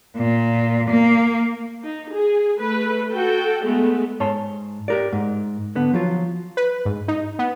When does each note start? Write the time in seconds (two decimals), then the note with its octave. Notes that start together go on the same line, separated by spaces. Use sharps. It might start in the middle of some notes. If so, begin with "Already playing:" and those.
0.17 A#2
0.90 A#3
1.83 D#4
2.12 G#4
2.57 A3 B4
3.12 F#4 A4 G5
3.62 G#3 A3 B3
4.20 G#2 C#5 A5 C6
4.88 G4 A#4 D5
5.13 G#2
5.75 D3 B3
5.93 F3 F#3 F4
6.57 B4
6.85 G#2
7.08 D#4
7.39 B3